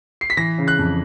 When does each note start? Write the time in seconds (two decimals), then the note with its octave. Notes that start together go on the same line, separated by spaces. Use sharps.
0.21 C7
0.30 B6
0.37 E3 A#6
0.58 C#3
0.68 F#6
0.79 F2